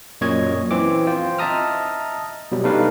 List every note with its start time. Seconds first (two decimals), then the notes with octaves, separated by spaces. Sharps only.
0.21 F#2 A#2 C#5 D#5 G#6
0.71 E3 C4 D6
1.07 F4 C5 G5
1.38 D#5 E5 A5 A#5 D#6 F6
2.52 B2 F#3 G3
2.64 G3 A3 D4 D#4 B4 F5